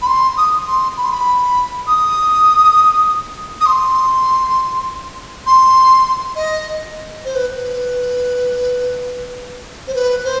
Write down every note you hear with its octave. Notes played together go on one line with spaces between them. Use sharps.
B5
C6
D#6
C6
B5
C6
B5
D#6
D#6
C6
C6
D#5
C5
B4
B4
C5
B4
C5